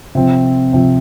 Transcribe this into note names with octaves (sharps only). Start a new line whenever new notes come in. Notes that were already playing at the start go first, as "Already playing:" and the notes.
C3 F3 C4
C3 F3 C4